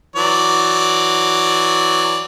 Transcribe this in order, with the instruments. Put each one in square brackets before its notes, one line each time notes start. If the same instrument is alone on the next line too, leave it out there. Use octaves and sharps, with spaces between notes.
[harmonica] E3 F#3 D5